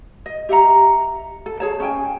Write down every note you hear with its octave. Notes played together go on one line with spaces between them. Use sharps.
D#5
G4 E5 F#5 A#5
A4
G#4 C#5 A5
C#4 G5 G#5